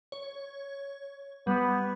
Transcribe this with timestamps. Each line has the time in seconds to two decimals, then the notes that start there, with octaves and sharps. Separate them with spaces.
0.12 C#5
1.47 G3 B3